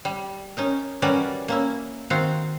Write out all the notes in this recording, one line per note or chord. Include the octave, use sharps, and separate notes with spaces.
G3
C#4 D#4 A#4
E3 G3 C#4 F#4 A#4 D5
A#3 C#4 E4
D#3 C4 F#4 F5